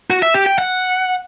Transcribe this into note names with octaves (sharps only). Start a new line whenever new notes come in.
F#4
E5
G4
G5
F#5